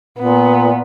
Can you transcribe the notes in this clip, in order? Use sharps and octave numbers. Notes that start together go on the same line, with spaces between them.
A#2 B3